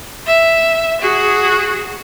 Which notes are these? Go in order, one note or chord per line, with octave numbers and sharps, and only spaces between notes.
E5
F#4 G#4